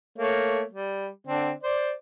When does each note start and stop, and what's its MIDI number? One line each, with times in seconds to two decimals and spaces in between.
0.19 0.62 57
0.19 0.62 58
0.19 0.62 73
0.71 1.08 55
1.27 1.51 50
1.27 1.51 60
1.27 1.51 62
1.63 1.92 72
1.63 1.92 74